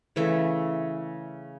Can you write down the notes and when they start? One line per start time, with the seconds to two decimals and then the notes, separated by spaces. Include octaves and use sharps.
0.16 C#3 E3 A3 E5